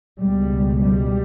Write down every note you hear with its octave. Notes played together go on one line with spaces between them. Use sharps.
C#2 B2 G3
G3